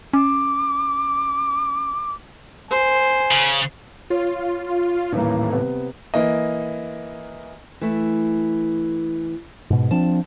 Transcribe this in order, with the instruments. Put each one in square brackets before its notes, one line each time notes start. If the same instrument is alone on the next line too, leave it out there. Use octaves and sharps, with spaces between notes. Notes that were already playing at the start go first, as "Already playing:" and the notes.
[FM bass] C#4 [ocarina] D6
[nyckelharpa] C5 [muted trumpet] G#5
[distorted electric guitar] C#3
[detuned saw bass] F4 [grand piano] C#5
[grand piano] D#1 E3 A#3 [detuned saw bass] A2
[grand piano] C3 B3
E3 A#3 D#5
[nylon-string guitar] E3 A3
[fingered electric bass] G#2 B2
[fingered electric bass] F3 C4 D4 [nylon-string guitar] A5